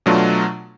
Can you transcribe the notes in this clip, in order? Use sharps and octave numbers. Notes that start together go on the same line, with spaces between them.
B2 F#3 A3 D4 F4